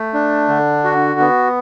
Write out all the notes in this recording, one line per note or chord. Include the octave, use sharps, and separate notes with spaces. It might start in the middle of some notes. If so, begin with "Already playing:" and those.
Already playing: A3
D4
D3
F#4
B3